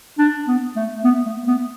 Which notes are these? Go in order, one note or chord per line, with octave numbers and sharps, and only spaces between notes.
D4
B3
A3
B3
A3
B3